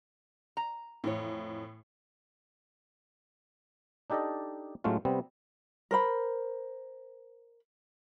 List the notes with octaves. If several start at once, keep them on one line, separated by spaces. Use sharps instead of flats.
A#5
F2 A2 E3 C#5
D4 D#4 G4 A4 D5 D#5
A2 F#3 G#3 A3 C#4 F4
C3 G3 B3 C4
A#4 C5 B5